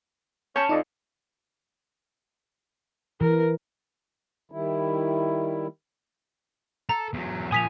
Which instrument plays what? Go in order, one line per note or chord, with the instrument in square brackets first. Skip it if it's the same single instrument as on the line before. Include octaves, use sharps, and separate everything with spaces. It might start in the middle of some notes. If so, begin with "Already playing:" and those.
[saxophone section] C#4 [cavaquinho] C#5 A5 B5 [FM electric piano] G#5 G6
[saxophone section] F2 [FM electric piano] D#4 D5 D#5
[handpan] E3 [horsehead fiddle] A#4
[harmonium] D#3 G3 E4
[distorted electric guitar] A4 [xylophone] A#5
[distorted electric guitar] E2 F#3
[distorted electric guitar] A#2 F3 [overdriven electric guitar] G#5 [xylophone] D#6 B6 F7